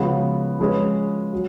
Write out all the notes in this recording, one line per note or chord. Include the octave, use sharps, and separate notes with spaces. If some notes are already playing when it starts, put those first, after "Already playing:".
Already playing: C#3 F3 G#3 B3 F#4
F3 G#3 C#4 G#4 B4
F#3